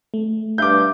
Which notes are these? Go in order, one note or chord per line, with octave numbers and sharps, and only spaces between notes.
A3
G2 B4 E5 F5 D6 G6